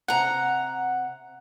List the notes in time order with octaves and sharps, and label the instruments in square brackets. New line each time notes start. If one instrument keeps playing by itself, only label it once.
[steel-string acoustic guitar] C3 A#5 [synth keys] F#5